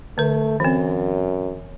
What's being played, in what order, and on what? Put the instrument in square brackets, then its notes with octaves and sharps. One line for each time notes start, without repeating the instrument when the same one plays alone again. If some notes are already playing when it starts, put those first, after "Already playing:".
[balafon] D3 B4 [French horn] A3
[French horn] F#2 [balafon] E3 C4